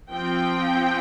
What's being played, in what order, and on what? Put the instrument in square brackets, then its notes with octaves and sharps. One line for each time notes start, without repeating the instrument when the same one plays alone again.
[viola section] F3 C4 G5